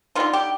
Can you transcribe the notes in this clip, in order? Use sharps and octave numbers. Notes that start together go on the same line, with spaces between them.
D3 G3 B3 D#4 F4
G4